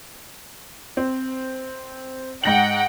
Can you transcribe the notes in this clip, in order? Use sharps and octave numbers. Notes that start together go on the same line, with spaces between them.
C4
G#2 F#5 G5 A#6 F#7